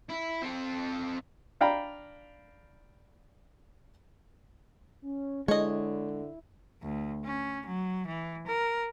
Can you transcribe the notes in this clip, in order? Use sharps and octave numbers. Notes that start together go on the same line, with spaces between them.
E4
C4 A4
D4 F5 G5 A#5 B5
C#4
D3 G#3 E4 C#5 D#5
D2
C#4
F#3
E3
A#4